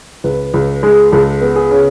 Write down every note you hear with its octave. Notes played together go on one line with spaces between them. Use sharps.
C#2 B4
C#2
G#3
C#2 A4
B3
G#4
C#3